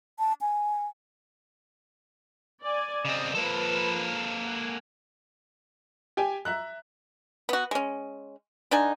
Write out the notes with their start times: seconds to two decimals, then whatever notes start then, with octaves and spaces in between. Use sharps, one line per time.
0.19 A5
0.41 G#5
2.63 D5 G#5
3.05 C#3 C4 D5 D#5
3.35 F3 A#3 A4 B4
4.47 F#5 G#5
6.17 G4 G5 G#5
6.45 E5 A#5 F#6
7.49 B3 F#4
7.71 G#3 C#4
8.71 D3 D4 D#4 G#5